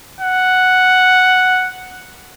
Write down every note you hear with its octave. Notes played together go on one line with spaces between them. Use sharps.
F#5